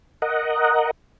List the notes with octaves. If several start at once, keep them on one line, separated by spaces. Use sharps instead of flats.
A#4 D#5 F#5